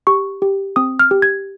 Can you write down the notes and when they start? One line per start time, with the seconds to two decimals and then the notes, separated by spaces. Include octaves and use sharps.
0.07 G4 C#6
0.42 G4
0.76 C4 D#6
0.99 F6
1.11 G4
1.22 G#6